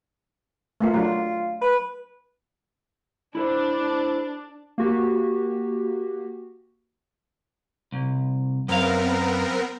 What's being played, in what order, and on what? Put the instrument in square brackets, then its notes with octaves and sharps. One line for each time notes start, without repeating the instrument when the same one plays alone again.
[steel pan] A3 A#3 F4
[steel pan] F#3 D4 [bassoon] F4
[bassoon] B4
[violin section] D4 [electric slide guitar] E4 A4 C5
[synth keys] A#3 F#4 G4
[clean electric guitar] C2
[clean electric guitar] F#2 F5 [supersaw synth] B3 C4 A#4